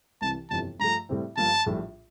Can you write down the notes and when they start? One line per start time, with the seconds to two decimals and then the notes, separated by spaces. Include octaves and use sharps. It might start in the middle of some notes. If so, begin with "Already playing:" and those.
0.21 C2 C3 E3 A5
0.50 G1 F2 C3 E3 G3 A5
0.79 G2 F3 A3 A#5
1.09 A2 G3 C4 E4
1.37 G1 G2 F3 A#3 A5
1.66 A#1 A2 G3